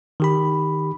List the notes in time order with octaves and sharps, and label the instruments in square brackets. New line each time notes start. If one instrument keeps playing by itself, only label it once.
[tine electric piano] D#3 G4 B5